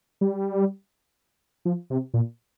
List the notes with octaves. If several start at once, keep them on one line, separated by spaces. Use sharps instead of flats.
G3
F3
C3
A#2